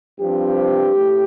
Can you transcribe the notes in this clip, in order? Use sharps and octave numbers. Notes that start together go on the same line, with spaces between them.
G2 F3 C4 G4
A2